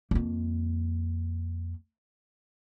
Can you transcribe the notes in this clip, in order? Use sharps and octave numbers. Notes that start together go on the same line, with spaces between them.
F2 A#3